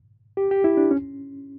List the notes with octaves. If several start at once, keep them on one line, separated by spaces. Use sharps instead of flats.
G4
G4
E4
D4
C#4